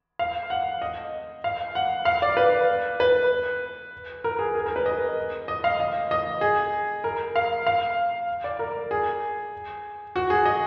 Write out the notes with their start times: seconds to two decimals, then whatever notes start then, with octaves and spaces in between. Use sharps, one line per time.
0.19 F5
0.50 F#5
0.82 D#5
1.44 F5
1.75 F#5
2.05 F5
2.22 D5
2.37 B4
3.00 B4
4.24 A#4
4.39 G#4
4.55 G#4
4.66 A#4
4.76 B4
4.86 D#5
5.48 D#5
5.64 F5
5.80 D#5
6.11 D#5
6.41 G#4
7.04 A#4
7.36 F5
7.67 F5
8.44 D5
8.59 A#4
8.91 G#4
10.16 F#4
10.30 G#4
10.45 D#5